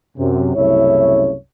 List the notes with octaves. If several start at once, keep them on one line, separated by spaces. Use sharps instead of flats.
F#2 C3
C2 F#2 C#3 A3 E4 C#5